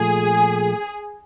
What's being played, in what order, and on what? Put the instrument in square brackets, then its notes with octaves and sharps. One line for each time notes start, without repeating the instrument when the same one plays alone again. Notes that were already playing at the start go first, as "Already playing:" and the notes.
Already playing: [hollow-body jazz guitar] A#2 F3 A3 [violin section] G#4